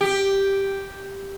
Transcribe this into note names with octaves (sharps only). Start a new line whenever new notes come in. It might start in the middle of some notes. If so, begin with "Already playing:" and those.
G4